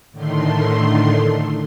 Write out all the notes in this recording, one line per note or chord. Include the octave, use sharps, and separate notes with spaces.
A2 D3 D#3 A3 C6